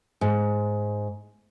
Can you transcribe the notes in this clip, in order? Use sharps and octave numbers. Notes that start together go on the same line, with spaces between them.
G#2